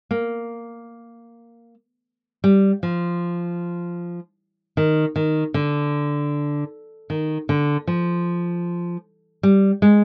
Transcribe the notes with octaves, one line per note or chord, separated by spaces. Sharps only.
A#3
G3
F3
D#3
D#3
D3
D#3
D3
F3
G3
G#3